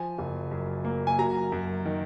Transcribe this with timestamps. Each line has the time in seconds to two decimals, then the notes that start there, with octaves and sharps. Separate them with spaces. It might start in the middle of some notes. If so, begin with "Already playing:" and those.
Already playing: F3 G#5
0.19 F#1
0.51 F#2
0.84 A#3
1.07 G#5
1.19 F#3 A#5
1.52 F#2
1.85 D#3